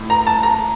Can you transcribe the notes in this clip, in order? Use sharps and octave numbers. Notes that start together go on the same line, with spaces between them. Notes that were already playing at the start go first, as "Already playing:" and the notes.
Already playing: A2
A#5
A5
A#5